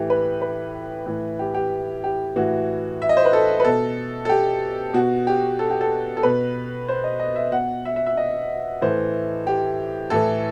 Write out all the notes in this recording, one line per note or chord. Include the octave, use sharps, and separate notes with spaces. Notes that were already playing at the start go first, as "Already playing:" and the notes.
Already playing: A2 E3 G4
B4
B4
A2 E3
G4
G4
G4
A2 E3 F#4
E5
D#5
C5
B4
A4
B4
B2 A4
A4
G4
B2 F#4
G4
A4
G4
A4
A4
B2 B4
C5
D#5
D#5
E5
B2 F#5
E5
E5
E5
D#5
A2 E3 C5
G4
A2 E3 A4